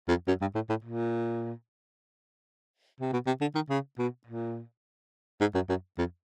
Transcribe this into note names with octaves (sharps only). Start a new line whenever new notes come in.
F2
F#2
G2
A2
A2
A#2
C3
B2
C3
D3
D#3
C#3
B2
A#2
G#2
F#2
F#2
F2